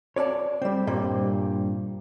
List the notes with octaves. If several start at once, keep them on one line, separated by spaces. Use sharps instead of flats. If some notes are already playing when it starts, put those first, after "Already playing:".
C#5 D5 F5 A5
G3 C4
G2 A#2 G3 C4